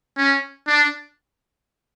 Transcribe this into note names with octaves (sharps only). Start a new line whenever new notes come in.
C#4
D4